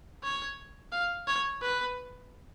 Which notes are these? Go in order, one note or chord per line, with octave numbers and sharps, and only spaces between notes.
C#5
F5
C#5
B4